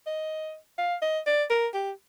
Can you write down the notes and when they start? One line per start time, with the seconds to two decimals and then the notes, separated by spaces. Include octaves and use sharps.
0.07 D#5
0.78 F5
1.02 D#5
1.26 D5
1.50 A#4
1.74 G4